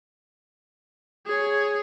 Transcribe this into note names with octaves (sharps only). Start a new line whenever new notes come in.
G#4 C#5